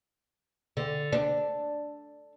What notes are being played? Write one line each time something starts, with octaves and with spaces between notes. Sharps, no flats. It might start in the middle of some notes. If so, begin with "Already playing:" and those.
D3
D4